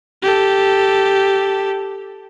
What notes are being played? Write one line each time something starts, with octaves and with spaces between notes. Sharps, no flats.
G4 A4